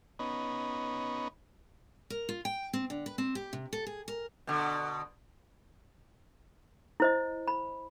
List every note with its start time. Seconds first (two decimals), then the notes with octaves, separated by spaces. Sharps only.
0.19 B3 C#4 D#4
2.10 A#4
2.29 F4
2.45 G5
2.73 C4
2.90 D3
3.06 B4
3.18 C4
3.35 G4
3.53 C3
3.73 A4
3.86 G#4
4.08 A#4
4.47 B2 D3
7.00 E4 C5 D#5
7.48 B5